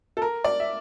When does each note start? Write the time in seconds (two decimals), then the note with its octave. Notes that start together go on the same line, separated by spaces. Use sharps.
0.17 A4
0.22 A#4
0.44 D5
0.60 E5